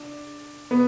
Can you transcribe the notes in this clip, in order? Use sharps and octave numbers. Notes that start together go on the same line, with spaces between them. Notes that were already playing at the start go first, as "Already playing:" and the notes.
Already playing: D4
B3